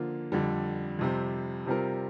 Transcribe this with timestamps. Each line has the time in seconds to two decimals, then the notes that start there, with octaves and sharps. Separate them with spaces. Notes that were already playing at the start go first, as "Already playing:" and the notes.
Already playing: D3 F3 A#3 F4
0.32 F2 D3 G3
0.99 F2 C3 G3 C4
1.66 C3 G3 C4 F4 A#4